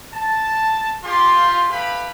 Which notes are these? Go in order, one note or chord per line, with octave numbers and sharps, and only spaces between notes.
A5
F4 G4 C6
E4 G4 A4 B4 F5 B5